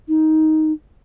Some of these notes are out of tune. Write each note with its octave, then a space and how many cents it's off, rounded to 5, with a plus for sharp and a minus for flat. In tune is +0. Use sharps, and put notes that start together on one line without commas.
D#4 +10